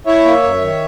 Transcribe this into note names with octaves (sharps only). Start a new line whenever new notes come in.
E4 C#5 E5
A#3
F#2
D#3